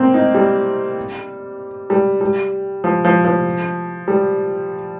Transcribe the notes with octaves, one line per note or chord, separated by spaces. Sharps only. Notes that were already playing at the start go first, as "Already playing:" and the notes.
Already playing: A#3 C4
D#4
G3
G3
G3
F3
F3
F3
G3